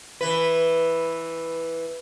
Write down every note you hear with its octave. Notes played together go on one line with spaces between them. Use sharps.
E3 B4